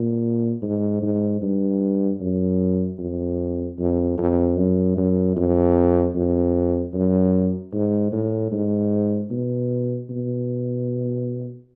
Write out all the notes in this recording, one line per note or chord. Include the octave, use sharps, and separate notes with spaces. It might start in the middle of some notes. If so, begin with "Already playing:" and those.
Already playing: A#2
G#2
G#2
G2
F#2
F2
F2
F2
F#2
F#2
F2
F2
F#2
G#2
A2
G#2
B2
B2